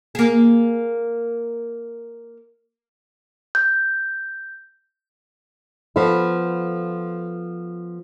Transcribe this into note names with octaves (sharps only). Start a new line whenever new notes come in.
A#3 G#4
G6
F3 B3 A4